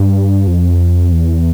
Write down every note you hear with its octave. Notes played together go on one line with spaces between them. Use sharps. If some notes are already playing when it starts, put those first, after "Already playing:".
Already playing: G2
F2
E2